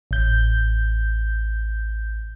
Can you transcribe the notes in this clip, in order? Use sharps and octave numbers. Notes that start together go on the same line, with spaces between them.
A1 G6